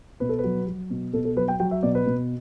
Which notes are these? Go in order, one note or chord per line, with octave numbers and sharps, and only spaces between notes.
B2 B4
A4
B4
F#3
F#3
B2
B2 A4
A4
F#3 B4
G5
F#3 G5
E5
B2 D5
B4
B2